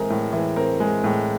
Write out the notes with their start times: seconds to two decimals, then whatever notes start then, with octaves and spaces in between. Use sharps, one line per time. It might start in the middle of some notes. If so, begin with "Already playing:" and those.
Already playing: A2 E3 G#3 C4 A#4
0.10 A2
0.33 E3
0.56 C4 A#4
0.80 G#3
1.04 A2